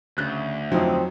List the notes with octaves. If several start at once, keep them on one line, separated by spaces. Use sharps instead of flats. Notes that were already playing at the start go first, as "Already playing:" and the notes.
D2 C#3 F#6
F2 F3 F#3 C4 D#4